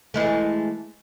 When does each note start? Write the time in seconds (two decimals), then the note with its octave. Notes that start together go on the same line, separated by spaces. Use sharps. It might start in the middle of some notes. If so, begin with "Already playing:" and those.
0.14 E3 G#3 A3